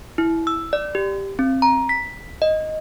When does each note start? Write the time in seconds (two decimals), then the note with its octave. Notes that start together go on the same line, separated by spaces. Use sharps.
0.18 E4
0.47 E6
0.73 D5
0.95 G4
1.39 C4
1.62 A#5
1.89 B6
2.42 D#5